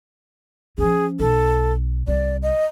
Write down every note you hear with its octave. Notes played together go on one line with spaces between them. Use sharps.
F3 C#4 G#4
B1 A4
C2 D5
D#5